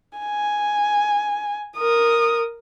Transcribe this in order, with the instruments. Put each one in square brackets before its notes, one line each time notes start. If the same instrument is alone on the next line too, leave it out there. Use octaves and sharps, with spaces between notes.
[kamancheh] G#5
A#4 D#6